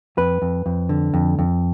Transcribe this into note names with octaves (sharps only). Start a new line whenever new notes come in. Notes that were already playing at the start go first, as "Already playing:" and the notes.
F2 B4
F2
F2
D3
F2
F2